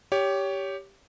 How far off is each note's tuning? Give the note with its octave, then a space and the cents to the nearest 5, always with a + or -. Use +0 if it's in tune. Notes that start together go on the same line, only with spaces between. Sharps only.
G4 +0 C#5 +20